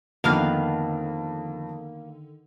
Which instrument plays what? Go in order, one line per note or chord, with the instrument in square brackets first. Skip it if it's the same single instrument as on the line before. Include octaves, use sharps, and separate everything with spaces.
[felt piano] F2 F6 [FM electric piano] D3 [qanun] D#3 B3 F5 [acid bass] A#3